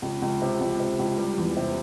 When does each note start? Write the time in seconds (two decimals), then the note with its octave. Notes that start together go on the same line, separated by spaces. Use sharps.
0.02 C#2
0.22 C#2
0.42 C3
0.61 C#2
0.80 C3
0.99 C#2
1.18 G3
1.37 E2
1.57 C3